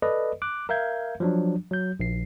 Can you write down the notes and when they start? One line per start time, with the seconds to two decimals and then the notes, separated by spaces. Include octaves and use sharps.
0.02 A4 B4 D5 D#5
0.42 D6 F#6
0.69 A#4 E5 F5 G6 G#6
1.20 F3 F#3 D4
1.71 F#3 G6
2.00 A#1 C7